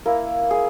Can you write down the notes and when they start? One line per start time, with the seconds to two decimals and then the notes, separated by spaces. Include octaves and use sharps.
0.06 A#3 E4 A#4
0.51 G#4